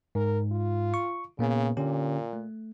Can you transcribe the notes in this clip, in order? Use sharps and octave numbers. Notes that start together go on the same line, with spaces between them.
G#2 A#4
F4
C#6
A#2 C#3 A#3 B3
A#2 D3 C#4 G4
A3